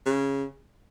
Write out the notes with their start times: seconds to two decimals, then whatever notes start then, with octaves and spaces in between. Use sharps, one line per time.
0.06 C#3